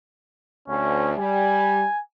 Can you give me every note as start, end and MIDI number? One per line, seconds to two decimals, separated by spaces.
0.68 1.14 38
0.68 1.11 61
1.18 1.83 55
1.18 2.01 80